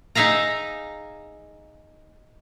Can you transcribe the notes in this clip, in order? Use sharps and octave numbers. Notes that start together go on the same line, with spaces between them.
D#4 G#4 E5 F5 A#5